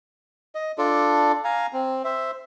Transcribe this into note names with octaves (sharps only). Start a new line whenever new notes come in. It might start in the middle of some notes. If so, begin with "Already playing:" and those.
D#5
D4 F4 A4 D5
F5 G#5 A#5
C4
C5 E5